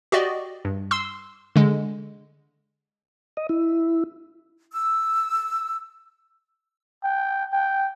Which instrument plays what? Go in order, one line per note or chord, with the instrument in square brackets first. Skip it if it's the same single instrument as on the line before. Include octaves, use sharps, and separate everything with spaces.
[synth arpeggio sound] F#4 G4 D5 D#5
G2
C6 E6
D3 G#3
[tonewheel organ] D#5
E4
[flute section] E6
[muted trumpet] G5
G5